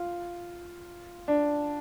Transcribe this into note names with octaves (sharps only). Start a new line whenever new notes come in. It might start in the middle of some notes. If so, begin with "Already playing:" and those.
Already playing: F4
D4